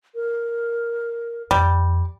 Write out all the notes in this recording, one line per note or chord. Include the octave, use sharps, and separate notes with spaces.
A#4
F2 G3